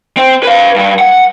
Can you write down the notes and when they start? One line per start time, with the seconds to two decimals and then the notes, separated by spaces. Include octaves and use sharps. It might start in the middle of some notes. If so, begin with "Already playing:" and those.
0.17 C4
0.43 B4 F5
0.76 G2 G3
0.99 F#5